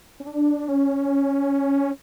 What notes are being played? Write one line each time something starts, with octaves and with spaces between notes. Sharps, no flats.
C#4
D4
C#4